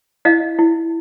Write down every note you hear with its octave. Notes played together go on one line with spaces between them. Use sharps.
E4 D#5 F5
E4